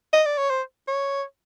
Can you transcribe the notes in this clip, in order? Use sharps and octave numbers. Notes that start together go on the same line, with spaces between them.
D#5
D5
C#5
C5
C#5